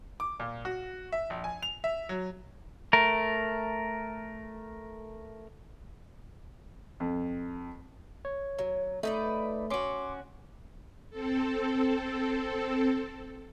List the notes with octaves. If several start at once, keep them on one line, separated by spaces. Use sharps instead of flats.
D6
A#2
F#4
E5
A#1
G#5
F7
E5
F#3
A3 A#4
F2
C#5
F#3
A3 D#4 B4 D5
C#4 F#4 C6 D6
C4 A4